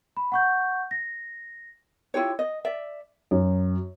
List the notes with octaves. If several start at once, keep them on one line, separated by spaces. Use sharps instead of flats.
B5
F#5 C#6 G6
A#6
E4 F4 G4 C#5
D#5
D5 E5
F#2